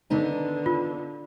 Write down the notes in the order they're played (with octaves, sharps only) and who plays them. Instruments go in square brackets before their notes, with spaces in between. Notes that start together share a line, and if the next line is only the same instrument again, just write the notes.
[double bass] D3 [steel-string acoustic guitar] D#3 B3 D#4
[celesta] F4